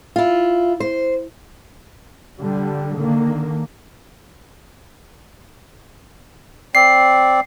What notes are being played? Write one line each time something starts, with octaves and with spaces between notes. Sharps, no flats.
E4 F4
C5
D3 G3
D3 D#3 A#3
C4 D5 C7